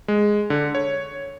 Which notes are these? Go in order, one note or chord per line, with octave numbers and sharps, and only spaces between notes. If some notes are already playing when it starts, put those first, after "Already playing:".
G#3
D3
C#5